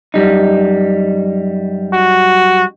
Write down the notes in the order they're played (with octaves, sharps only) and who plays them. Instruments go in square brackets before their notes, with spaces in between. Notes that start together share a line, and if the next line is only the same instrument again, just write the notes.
[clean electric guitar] F#2 G3 D#4
[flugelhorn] F#4